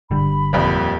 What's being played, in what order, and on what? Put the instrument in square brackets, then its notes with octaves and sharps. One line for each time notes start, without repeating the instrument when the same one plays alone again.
[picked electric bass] G1 D3 G3 [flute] B5
[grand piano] D#1 F2